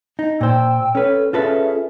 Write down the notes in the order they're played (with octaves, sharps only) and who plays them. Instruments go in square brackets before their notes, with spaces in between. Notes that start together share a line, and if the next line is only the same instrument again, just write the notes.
[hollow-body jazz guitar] D#4
[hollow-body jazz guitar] A#2 C5 [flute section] G5 E6
[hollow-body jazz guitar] C#4 B4 [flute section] A4 C#5
[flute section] C#4 G#4 E5 [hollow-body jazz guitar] F4 A4 B4